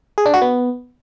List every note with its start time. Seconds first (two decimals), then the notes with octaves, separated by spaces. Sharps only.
0.18 G#4
0.26 D4
0.34 F#4
0.42 B3